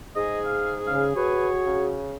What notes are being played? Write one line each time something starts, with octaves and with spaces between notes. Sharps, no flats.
G#2 G#4 D#5
F5
C#3 F5
F#4 B4 C#5
C#3